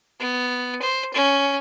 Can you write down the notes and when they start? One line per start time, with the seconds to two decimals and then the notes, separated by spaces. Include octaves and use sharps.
0.19 B3
0.82 C5
1.14 C#4